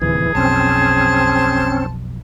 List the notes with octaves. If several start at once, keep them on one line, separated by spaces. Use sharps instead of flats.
D1 D#2 C3 E3 G#4
B1 F2 B2 C4 C#4 C5 A5